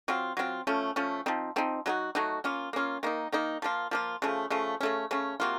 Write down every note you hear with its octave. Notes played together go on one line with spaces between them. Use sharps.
F#3 C4 F4
F#3 C4 F4
F3 A3 C#4
F3 A3 C#4
F3 C4 D#4
F3 C4 D#4
F#3 A3 D#4 F#4
F#3 A3 D#4 F#4
A#3 C#4 F4
A#3 C#4 F4
D#3 A#3 D#4
D#3 A#3 D#4
F3 A#3 F4
F3 A#3 F4
C#3 F3 A3
C#3 F3 A3
C#3 A3 C#4
C#3 A3 C#4
C3 F#3 A#3 F4